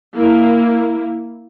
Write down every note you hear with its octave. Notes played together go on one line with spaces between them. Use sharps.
A#3 E4